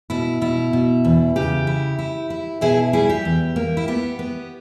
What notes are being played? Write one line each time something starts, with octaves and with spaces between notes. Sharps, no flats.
B2 E4
B2 E4
B2
E2
C#3 G4
E4
E4
E4
B2 E4 G#4
G3 E4 G#4
G4
E2
A#3
E4
B3 G4
B3